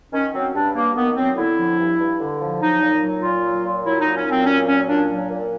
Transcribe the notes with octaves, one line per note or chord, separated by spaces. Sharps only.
D#3 C#4
F#3 C4
G2 D4
G2 A#3
D#3 B3
F#3 C4
D3 E4
F3
G2
G2
D3
F3
F#3 D#4
A#2
F#3
A#2 F4
F#3
A#2
F#3 E4
D#4
A#2
C#4
F#3
C4
A#2 C#4
F#3 C#4
A#2 D4
F#3
A#2